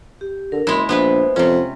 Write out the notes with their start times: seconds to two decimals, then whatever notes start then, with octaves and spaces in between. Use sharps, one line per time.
0.21 G4
0.52 D3 A#4
0.67 F#1 G#3 E4 B5 C6
0.89 A#1 B3 E4 B4 C5
1.36 F2 C3 C#4